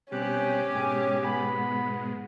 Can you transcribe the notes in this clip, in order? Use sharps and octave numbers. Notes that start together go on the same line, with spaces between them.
B2 G3 C4 C#4 G4 F#6
G#2 B2 G#3 G#5
B3 B5